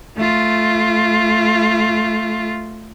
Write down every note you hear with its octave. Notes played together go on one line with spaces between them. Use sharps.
A3 F4